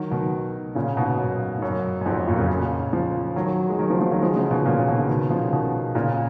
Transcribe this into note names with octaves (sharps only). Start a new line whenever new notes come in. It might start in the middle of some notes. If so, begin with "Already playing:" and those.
Already playing: D#3 F#3
B2 D#3
A#2 C#3
G#2 B2
F#2
G#2
F#2
F#2
F2 G#2
F#2
F#2 A#2
A#2 C#3
C#3 F3
D#3 F#3
G#3
D#3 F#3
C#3 F3
C#3 F3
D#3 F#3
F3 G#3
C#3 F3
B2 D#3
A#2 C#3
C#3
B2 D#3
C#3
B2 D#3
C#3 F3
B2 D#3
A#2 C#3